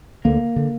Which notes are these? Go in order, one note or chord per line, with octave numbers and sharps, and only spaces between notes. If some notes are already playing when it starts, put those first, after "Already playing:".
D2 D3 A#3
D3